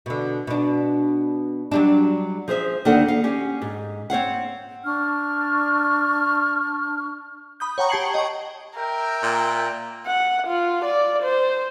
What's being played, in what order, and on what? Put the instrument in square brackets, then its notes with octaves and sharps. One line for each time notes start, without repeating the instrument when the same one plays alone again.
[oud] B2 D3
B2 D4
F#3 G3 D4
[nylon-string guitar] F3 G#4 C5 E5
D2 D#3 A#3 D4 A4 F#5
F5
C#4 G4
G#2
C4 C#5 F5 F#5
[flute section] D4 C#6 F6
[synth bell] B5 D#6 G6
C#5 F#5 G5 A#5 C#6
G4 A5 G#6 C7 C#7 F#7
D#5 G5 C#6
[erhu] A#4 [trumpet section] E5 G5
[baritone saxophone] A#2
[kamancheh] F#5
F4
D5
C5